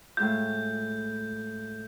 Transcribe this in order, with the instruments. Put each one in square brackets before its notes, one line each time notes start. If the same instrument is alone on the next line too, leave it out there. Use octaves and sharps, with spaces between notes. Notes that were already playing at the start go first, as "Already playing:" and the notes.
[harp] A2 G#3 F4 [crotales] G6